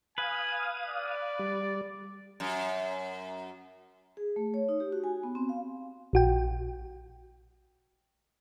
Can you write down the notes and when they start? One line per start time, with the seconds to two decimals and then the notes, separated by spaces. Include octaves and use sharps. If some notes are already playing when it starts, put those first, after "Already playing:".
0.18 B4 F5 G#5 D#6
0.88 D5
1.39 G3
2.40 F#2
4.17 G#4
4.36 A3
4.54 C#5
4.69 D#4
4.80 G4
4.92 F#4
5.04 G#5
5.23 B3
5.35 C4
5.49 F5
6.13 A#1 F#4 G5